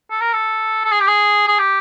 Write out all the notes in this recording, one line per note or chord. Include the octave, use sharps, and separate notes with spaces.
A4
A#4
A4
A4
G#4
G4
G#4
G#4
G4